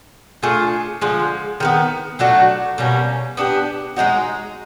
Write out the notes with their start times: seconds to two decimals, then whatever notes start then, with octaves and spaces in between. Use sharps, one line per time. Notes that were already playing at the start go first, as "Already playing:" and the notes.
0.43 A3 D4 F4 G#4
1.01 D3 F3 G#3
1.60 D#3 G#3 B3
2.19 F#3 A3 D4 F#4
2.78 B2 G3 A#3 C#4
3.37 B3 D4 G4
3.96 G#3 B3 D#4 F#4